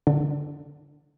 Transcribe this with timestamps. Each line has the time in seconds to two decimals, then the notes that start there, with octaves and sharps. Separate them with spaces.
0.07 D3